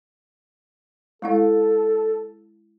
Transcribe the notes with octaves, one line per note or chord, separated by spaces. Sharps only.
G#3 E4 A4 F5